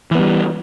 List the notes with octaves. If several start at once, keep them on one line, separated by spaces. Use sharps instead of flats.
E3 G3 B3